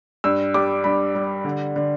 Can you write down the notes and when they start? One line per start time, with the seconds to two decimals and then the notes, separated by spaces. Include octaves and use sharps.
0.24 G2 E6
0.54 G3 D6
0.84 G2 B5
1.15 G3
1.44 D3
1.76 D3